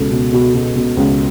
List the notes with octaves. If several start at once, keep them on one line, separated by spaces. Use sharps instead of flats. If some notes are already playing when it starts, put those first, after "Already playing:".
Already playing: C#2 B2 A4
B2
B2
B2
B2
C#2